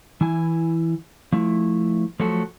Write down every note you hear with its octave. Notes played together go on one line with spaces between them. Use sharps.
E3 E4 G#5
F3 A3 E4
F3 F#3 A3 F#4 A4